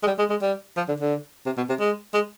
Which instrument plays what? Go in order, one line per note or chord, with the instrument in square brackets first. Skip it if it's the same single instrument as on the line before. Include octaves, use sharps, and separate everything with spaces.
[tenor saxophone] G#3
G3
G#3
G#3
G3
F3
D3
D3
C3
B2
C3
G#3
G#3